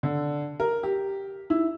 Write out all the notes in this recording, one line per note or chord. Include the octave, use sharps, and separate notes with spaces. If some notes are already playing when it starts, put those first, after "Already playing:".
D3
A#4
G4
E4